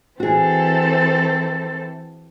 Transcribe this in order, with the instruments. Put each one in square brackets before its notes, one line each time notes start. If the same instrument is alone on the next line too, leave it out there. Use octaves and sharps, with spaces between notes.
[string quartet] E3 C4 A4 [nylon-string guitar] F#4 G#4